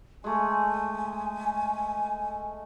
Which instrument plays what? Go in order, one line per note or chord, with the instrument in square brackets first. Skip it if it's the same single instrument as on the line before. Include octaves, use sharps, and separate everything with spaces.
[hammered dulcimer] G#3 A3 [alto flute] G#5